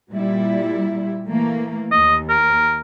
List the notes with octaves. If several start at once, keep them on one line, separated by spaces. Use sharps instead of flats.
A#2 G3 E4
E3 A3 A#3
D#2 D#5
A#4